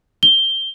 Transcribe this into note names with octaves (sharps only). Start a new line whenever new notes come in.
G7